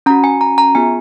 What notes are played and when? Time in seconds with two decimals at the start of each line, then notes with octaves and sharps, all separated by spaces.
0.06 C#4 A#5
0.10 F#4
0.24 G#5
0.41 A#5
0.58 A#5
0.75 B3 F4 G#4 G#5